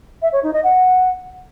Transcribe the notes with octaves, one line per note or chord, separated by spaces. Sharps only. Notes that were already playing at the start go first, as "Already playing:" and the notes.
E5
C#5
D#4
D#5
F#5